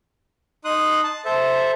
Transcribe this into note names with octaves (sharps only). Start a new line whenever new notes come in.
D#4 C6 D#6 F#6
A5
A4 C5 E5